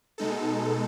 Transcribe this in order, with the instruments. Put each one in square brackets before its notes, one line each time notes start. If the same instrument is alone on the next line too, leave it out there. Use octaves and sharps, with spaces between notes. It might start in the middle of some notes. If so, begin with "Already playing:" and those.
[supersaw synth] B2 G#3 D#4 A4